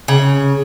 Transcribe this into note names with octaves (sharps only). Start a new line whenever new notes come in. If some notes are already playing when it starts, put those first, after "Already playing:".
C#3